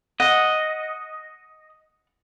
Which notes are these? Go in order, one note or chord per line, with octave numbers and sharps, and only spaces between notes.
D#5 F#5